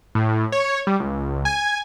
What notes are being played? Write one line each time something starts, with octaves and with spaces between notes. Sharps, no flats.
A2
C#5
G3
C#2
G#5